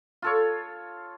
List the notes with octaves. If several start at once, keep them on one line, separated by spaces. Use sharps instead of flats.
F4 A4 C#5